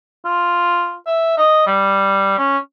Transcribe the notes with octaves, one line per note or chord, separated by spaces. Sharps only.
F4
E5
D#5
G3
C#4